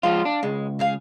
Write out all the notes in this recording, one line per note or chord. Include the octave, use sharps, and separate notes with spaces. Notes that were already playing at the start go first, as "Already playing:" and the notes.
F3 G#3 F4 F5
D4
C#2 G#3
C#3 G#4 F5